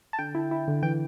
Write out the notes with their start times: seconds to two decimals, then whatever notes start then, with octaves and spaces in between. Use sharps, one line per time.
0.13 A5
0.19 D3 G5
0.35 E4
0.51 E4
0.68 D3
0.83 E3 G5